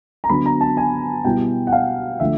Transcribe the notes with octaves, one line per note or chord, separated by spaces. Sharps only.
A#5
D3 F#3 B3 D4 B5
A#5
A5
G#5
B2 G3 B3 E4 G5
F#5
F5
D3 F3 A3 E5